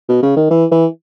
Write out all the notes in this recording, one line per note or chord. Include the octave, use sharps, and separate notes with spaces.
B2
C#3
D#3
E3
E3